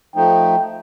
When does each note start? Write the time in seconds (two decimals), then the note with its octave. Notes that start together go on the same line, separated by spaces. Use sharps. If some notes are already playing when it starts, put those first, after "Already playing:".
0.16 F3 A3 D#4 G5